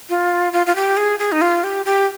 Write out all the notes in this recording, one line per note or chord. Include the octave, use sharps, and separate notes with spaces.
F4
F4
F4
G4
G#4
G#4
D#4
F4
G4
G4